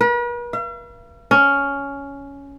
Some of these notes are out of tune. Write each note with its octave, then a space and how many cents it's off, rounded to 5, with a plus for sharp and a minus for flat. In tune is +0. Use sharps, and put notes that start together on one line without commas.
B4 -45
F5 -45
C#4 +10